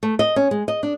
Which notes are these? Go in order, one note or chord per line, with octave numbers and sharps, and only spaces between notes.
A3
D#5
C#4
G#3
D#5
D4